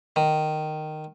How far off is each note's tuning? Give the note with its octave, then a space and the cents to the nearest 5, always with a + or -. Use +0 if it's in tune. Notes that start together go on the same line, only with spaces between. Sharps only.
D#3 -10